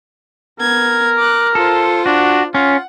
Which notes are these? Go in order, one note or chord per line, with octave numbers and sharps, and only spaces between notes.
B3 A#4 G#6
D6 F#6
F4 A4 C5
D4 F#4
C#4 F4 F#5